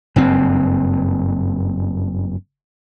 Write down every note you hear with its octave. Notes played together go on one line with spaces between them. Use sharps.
F#1 G2 C4